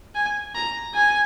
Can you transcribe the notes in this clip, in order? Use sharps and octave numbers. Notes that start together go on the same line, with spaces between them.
G#5
A#5
G#5